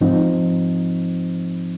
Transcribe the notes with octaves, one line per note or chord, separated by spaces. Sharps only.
G#2 F3 C4 D#4